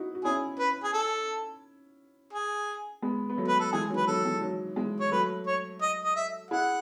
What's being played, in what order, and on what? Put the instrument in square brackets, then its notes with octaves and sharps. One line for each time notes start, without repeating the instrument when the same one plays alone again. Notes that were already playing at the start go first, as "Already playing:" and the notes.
Already playing: [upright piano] D#4 E4 F#4
F#4
[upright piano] C#4 E4 [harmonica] G#4
[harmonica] B4
G#4
A4
G#4
[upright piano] G#3 B3
B3
F#3 A3
[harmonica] B4
A4
[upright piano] E3 G#3 [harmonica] G#4
[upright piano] D#3 F#3
[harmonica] B4
[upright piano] D#3 F#3 [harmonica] A4
[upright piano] E3 G#3
D#3 F#3
E3 G#3
[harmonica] C#5
[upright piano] F#3 A3 [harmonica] B4
[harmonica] C#5
D#5
D#5
E5
[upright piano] E4 G#4 [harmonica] F#5